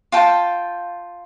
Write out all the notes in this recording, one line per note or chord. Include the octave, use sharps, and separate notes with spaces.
F4 G5 A5